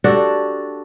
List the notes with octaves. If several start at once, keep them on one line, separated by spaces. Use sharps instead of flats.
D4 F#4 G4 A4